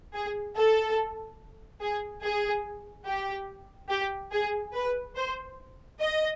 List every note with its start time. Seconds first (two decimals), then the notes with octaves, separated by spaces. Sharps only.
0.14 G#4
0.56 A4
1.81 G#4
2.23 G#4
3.07 G4
3.90 G4
4.32 G#4
4.74 B4
5.16 C5
6.00 D#5